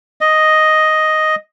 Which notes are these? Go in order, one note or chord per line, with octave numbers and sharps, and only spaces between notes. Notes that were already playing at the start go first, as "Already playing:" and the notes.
D#5